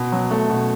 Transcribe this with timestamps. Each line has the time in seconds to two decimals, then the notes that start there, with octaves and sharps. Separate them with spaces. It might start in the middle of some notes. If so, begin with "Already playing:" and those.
Already playing: B2
0.12 F#3
0.31 A3
0.50 B2